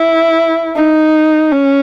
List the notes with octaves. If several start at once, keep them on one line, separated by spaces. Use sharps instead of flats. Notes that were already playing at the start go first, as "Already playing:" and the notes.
Already playing: E4
D#4
C#4